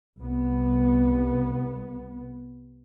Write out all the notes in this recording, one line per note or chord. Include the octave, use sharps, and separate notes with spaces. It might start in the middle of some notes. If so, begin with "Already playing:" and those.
C2 B3